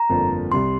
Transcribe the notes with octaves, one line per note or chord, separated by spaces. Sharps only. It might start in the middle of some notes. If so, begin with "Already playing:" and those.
Already playing: A#5
G1 F2 D3 F3 A#3
C2 C3 G3 C4 C6